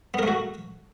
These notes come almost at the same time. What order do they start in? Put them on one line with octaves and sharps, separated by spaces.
B3 A#4 A3 F#4